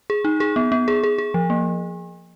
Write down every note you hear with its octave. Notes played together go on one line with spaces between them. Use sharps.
G#4
D#4
G#4
B3
B3
G#4
G#4
G#4
F3
A#3